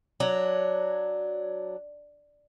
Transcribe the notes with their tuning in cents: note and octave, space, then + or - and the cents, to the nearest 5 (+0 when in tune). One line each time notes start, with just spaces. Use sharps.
F#3 +0 D4 +0